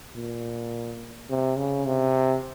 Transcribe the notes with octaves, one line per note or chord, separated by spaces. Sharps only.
A#2
C3
C#3
C3